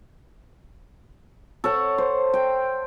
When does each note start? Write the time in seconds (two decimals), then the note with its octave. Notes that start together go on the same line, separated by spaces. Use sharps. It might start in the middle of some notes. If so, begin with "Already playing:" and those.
1.64 A4 C#5 F#5
1.98 C5
2.34 G5